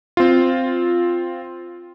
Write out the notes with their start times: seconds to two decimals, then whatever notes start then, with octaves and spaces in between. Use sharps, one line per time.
0.17 C4 F4